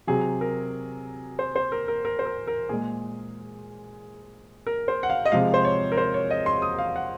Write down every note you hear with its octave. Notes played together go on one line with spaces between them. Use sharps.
C3 F#3 G#4
A#4
C5
C5
A#4
A#4
A#4
C5
A#4
A#4
A#2 G#3 G#4
A#4
C5
F#5
F5
D#5
C3 F3 G#3 F5
C5
C#5
A#4
C5
C#5
D#5
C6
D#6
F5
F#5